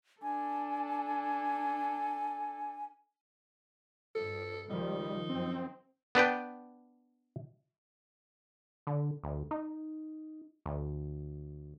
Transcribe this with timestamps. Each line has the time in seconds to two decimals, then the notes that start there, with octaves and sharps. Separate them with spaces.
0.22 D4 A4 G#5
4.15 G2 A4
4.70 C#2 D#3 F3 G3 D#4
5.29 F#2 F3 C4
6.15 B3 D4 B4 G5
8.87 D3
9.24 D2
9.51 D#4
10.66 D2